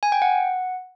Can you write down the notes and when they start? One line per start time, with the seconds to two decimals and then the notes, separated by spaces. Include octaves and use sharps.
0.03 G#5
0.12 G5
0.22 F#5